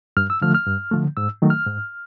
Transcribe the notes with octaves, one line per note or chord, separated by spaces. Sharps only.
G2 F6
E6
D3 F3 A3 F6
F6
G2
D3 F3 A3
G#2 E6
D#3 F#3 A3
F6
G#2